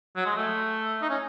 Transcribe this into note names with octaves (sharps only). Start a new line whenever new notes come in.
F#3
G#3
A3
D#4
C#4